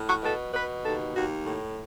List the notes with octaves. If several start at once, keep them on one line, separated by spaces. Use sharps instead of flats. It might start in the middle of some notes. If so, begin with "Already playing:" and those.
Already playing: A2
F#4
B2 A4
B2 B4
D#2 A4
D#2 F#4
A2